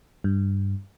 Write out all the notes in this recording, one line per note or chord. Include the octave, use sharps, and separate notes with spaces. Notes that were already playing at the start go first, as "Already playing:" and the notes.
G2